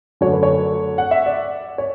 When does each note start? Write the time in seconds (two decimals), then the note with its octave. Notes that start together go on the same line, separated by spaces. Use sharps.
0.21 F#2 D3 F#3 A3 C#5
0.32 B4
0.43 C#5
0.98 F#5
1.11 E5
1.26 D5
1.78 C#5